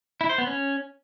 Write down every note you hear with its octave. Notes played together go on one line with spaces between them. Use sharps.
E4
C5
B3
C#4